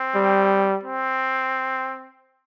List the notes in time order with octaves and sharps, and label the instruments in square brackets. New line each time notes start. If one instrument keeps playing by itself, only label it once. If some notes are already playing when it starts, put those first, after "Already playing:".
Already playing: [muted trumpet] C4
[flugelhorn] G3
[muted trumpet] C4